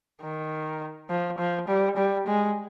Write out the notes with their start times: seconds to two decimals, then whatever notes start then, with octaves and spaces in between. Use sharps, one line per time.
0.22 D#3
1.10 F3
1.38 F3
1.68 G3
1.97 G3
2.27 G#3